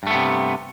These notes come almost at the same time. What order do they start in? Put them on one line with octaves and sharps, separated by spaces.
G2 A3 B3 C3